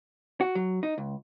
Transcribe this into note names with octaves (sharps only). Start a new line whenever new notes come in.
F#4
F#3
D#4
C#2